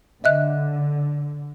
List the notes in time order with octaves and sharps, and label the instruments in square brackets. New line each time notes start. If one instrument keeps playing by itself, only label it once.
[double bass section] D3 [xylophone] D#5 E5 F#6